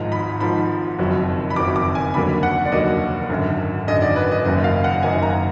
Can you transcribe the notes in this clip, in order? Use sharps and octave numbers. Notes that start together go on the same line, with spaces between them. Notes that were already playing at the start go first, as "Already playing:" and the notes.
Already playing: G#1 G#2 F3 A#5
B5
G#1 G#2 F3 B5
F#1 F2 D#3 F#3
B5
F#1 F2 D#3 F#3 D6
D6
G#5
F1 D#2 D3 F#3 A#3 B5
F#5
D5
F1 D#2 D3 F#3 A#3 D#5
G#1 F#2 D3
G#1 F#2 D3 D#5
D5
B4
D#5
F#1 F#2 D#3 A#3 D#4 D#5
F5
F#5
F#1 F#2 D#3 A#3 D#4 G#5
A#5